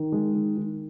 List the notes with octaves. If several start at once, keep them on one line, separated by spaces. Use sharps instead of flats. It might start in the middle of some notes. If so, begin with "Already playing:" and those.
Already playing: D#3
G#3
D#3
D#3